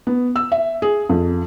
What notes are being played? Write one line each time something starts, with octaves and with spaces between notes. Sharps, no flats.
B3
E6
E5
G#4
F2